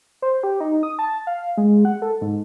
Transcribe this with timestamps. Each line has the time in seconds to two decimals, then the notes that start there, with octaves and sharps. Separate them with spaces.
0.22 C5
0.43 G4
0.60 D#4
0.83 D#6
0.99 A5
1.27 F5
1.57 G#3
1.85 F#5
2.02 A4
2.21 G#2